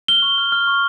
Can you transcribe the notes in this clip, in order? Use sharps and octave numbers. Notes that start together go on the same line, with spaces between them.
F6 G7
C#6
F6
F6
C#6